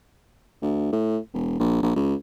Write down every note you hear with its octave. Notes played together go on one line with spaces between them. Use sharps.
D2
A2
E1
A#1
A#1
C#2